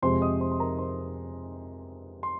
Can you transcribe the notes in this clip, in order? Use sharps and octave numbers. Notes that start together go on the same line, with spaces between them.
F2 C3 G#3 C5 C6
D#5 D#6
C5 C6
C6
A#4 A#5
C5 C6
C6